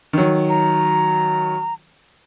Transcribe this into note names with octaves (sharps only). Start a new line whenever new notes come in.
D#3 F#3
A#5